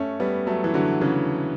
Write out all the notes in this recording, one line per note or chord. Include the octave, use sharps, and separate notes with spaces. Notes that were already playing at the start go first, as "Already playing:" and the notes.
Already playing: A3 C#4
G3 B3
F#3 A3
E3
D3 F#3
C#3 E3